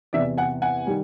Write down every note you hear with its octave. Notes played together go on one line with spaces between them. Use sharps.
E2 C3 E3 D5 E5
F#5 G#5
F#5 G#5
D#3 G3